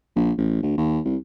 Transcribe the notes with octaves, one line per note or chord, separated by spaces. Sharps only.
A#1
A1
D2
D#2
C2